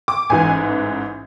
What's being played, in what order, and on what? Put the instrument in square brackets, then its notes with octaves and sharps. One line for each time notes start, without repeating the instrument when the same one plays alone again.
[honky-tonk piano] D6
A1 G#2 E3 G#5